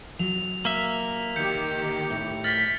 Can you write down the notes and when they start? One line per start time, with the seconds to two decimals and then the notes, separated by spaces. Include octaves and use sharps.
0.19 F#3 F7
0.65 A#3 E5
1.36 D#3 G4 G6 C#7
2.10 A2
2.44 F6 A6 B6 F#7